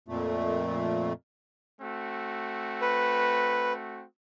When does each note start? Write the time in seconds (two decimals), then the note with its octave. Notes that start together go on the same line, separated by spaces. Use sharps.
0.08 F2 A#2 A3
1.81 A3 C4 F#4
2.82 B4